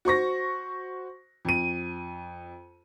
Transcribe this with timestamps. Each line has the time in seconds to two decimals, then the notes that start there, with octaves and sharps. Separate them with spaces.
0.05 F#4 C5 C#6 A#6
1.45 F2 D#7